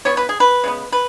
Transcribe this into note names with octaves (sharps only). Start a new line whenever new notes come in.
E3 B3 C#5
B4
G#4
B4
C#3 G#3 B3
B4